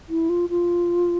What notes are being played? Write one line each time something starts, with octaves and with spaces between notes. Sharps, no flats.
E4
F4
F4